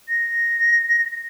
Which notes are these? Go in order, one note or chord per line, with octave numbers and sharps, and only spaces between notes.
A#6